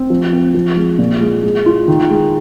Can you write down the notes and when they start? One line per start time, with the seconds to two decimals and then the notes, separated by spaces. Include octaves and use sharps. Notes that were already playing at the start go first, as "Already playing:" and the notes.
Already playing: C4
0.10 F3
0.33 C4
0.54 F3
0.77 G#3
0.99 A#2
1.21 G#3
1.43 G#3
1.66 F4
1.88 D#3
2.10 G#3